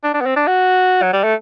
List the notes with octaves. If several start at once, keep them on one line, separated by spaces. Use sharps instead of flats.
D4
D4
B3
C4
D4
F#4
F#3
G3
A3